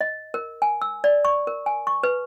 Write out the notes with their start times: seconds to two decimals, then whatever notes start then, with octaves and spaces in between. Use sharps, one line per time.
0.01 D#5
0.34 A#4
0.62 G#5
0.82 E6
1.04 D5
1.25 C#6
1.47 A#4
1.66 G#5
1.87 C#6
2.04 B4